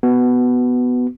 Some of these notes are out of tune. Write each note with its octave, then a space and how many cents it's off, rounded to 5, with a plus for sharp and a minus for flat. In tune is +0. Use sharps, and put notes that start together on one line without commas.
B3 +5 F#4 +20